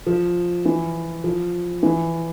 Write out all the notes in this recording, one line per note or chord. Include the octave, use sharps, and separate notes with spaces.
F3
E3
F3
E3